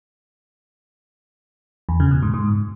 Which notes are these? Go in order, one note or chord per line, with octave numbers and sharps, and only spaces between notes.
E2
C#3
B2
G#2
G#2